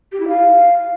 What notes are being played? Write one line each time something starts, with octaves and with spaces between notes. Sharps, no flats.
G4
E4
F5